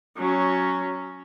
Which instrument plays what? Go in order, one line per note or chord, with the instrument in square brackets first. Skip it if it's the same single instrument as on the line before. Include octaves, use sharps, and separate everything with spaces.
[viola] F#3 C#4